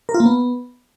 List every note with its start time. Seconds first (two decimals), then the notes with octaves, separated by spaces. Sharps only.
0.09 A#4
0.14 F4
0.20 A#3
0.26 B3